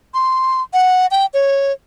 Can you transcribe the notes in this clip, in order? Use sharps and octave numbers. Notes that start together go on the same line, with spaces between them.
C6
F#5
G5
C#5